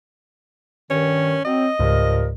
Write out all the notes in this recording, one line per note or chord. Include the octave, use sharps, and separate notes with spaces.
G2 D#3 C#4
F#3 C4 D#5
C#2 G#2 F3 G3 A#4